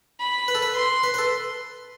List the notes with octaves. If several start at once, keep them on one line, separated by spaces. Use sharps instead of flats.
B5
B4
A4
B4
C6
B4
B4
A4